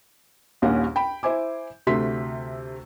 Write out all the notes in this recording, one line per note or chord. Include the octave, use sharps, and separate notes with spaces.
A#1 D#2 A#2 G3 C#4 F#5
G5 B5
E4 C5 G#5 D6
D2 C3 A3 C6 B6